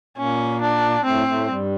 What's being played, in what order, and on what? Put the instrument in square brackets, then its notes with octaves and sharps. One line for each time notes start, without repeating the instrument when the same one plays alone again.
[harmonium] A#2 A#3 [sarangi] C#4
[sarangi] D4
[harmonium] A2 A3 [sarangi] C4
[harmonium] A2 A3
G2 G3